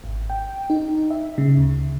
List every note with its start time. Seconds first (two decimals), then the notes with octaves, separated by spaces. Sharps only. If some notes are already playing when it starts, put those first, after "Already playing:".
0.04 G#1
0.30 G5
0.70 D#4
1.10 E5
1.38 C#3
1.57 D2